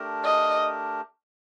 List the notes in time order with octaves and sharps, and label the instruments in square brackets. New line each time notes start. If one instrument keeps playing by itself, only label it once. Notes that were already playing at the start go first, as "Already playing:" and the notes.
Already playing: [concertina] A3 D4 G4 A#4
[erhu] D#5